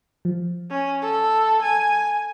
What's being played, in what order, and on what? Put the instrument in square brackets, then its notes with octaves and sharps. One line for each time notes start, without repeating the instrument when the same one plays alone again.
[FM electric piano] F3
[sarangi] C#4
A4
G#5